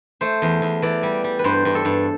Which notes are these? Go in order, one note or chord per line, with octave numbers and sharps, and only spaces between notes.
A3 C5
E2
E2
E3 D5
G3
G3
B4
G2 C5
G2
A4
G2